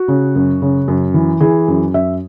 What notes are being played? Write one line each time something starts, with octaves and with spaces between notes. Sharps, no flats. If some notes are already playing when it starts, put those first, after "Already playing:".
Already playing: F#4
C#3
F#2
C#3
F#2
E3
E3 G#4
F#2
F#2 E5